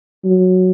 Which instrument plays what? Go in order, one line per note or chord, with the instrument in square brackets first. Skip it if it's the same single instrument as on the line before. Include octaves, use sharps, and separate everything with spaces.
[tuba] F#3